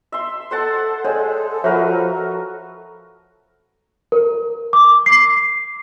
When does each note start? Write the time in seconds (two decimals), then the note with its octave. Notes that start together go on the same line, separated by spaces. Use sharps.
0.12 E5 C6
0.51 A4 C5 F#5 A5
1.05 G#3 A4 C#5 D5 G5
1.64 F3 F#4 A#4 B4 C#5 E5 F#5
4.12 A#4
4.73 D6
5.06 C7